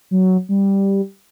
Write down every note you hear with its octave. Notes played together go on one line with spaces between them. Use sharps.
F#3
G3